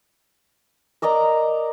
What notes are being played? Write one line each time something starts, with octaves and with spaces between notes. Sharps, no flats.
A#4 D5 D#5 A#5